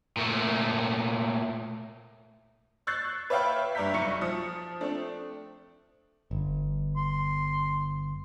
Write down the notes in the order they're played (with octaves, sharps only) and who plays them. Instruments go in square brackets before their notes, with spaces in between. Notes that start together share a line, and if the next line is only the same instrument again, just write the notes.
[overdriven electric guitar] A#2 A3
[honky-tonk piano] C#6 E6 F#6 G6 A6 C7
B4 C#5 E5 F5 G5 B5
G2 D5 E5 A#5 G6 B6
F1 B1 C#6 C#7
F3 D#6
A3 C4 D4
[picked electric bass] G1
[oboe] C6